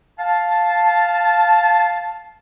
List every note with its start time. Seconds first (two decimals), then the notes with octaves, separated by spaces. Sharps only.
0.19 F5 A5